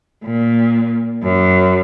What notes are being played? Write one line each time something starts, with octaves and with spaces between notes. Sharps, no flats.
A#2
F#2